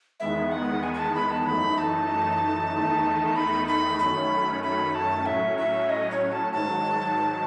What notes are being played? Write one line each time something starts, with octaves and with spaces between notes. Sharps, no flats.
E2 D#3 G#3 B3 E5
F#5
G#5
G#5
A5
B5
A5
F#2 E3 A3 D#4 B5
A5
E2 D#3 A3 D#4
B5
B5
F#2 D#3 F#3 A3 C#4 B5
B5
A5
A2 F#3 C#4 E5
E5
D#5
C#5
A5
G#2 D#3 F#3 A5